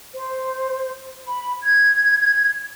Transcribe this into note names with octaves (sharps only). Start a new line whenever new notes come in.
C5
B5
G#6